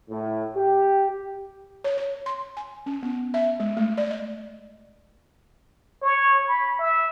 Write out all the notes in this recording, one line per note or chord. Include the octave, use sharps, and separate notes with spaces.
A2
G4
C#5
C#5
C6
G#5
C#4
B3
E5
G#3
A3
D5
D#5
C#5
B5
E5